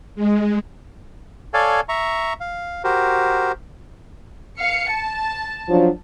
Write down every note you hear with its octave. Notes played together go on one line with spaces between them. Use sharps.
G#3
A4 C#5 D5 F5 G#5
E5 A#5 C#6
F5
F#4 G4 A#4 C5
F5 C#7
A5
F3 F#3 D4